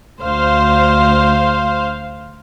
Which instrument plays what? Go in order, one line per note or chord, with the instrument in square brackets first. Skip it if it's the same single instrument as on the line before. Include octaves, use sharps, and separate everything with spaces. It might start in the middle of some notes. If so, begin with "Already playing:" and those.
[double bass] D2 [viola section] C5 F5